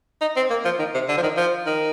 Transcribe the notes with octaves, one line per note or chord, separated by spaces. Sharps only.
D#4
C4
A#3
F3
D#3
C3
D3
F3
D#3
F3
D#3